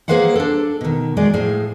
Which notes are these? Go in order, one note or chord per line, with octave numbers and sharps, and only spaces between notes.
A#3 G#4 B4 C5 F5 F#5
D4 A4
B2 D#3
F#3 G#3 G#4 D5
A2 F3 G#4